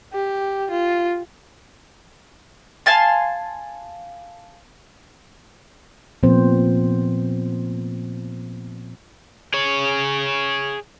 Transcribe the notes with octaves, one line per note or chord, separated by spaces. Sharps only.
G4
F4
F5 G#5 A5 C6
A#2 F3 B3 C4 C5
G#4 C#5